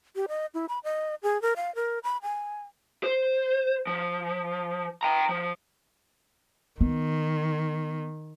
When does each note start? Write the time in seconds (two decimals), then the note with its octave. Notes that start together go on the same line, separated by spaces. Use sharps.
0.16 G4
0.29 D#5
0.54 E4
0.69 B5
0.84 D#5
1.23 G#4
1.42 A#4
1.56 F5
1.75 A#4
2.04 B5
2.22 G#5
3.03 C5
3.87 F3
5.03 G5 A#5
5.29 F3
6.81 D#3 B3